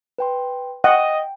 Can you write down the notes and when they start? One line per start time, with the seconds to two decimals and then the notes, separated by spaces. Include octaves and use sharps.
0.18 B4 G5 C6
0.84 D#5 F#5 G5